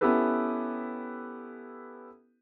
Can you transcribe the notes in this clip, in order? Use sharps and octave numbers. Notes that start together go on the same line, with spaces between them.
B3 C#4 E4 G4 A4 B4